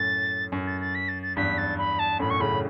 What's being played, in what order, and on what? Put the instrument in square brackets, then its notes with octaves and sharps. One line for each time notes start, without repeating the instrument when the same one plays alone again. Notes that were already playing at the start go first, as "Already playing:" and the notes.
Already playing: [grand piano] F#2 A2 [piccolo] A6
[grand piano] F#2
[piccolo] A6
A6
B6
A6
A6
[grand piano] E2 G2 [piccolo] B6
[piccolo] A6
B5
A5
[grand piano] F#2 A2 [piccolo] B5
[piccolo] C#6
[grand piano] A2 C#3 [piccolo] B5